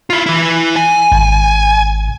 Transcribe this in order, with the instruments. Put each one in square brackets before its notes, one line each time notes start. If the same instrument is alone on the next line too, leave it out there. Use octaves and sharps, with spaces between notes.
[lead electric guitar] E4 F4
E3 E4
G#5
[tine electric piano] G#1